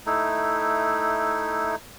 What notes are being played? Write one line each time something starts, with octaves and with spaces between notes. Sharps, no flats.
A3 D#4 E4